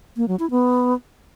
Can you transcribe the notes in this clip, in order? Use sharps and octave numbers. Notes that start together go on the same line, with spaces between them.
A#3
F#3
E4
B3